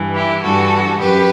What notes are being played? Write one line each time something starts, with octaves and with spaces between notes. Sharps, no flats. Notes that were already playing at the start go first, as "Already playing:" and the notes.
Already playing: G2 E3
E4 G4
G2 E3 F#4 A4
F#2 G4 B4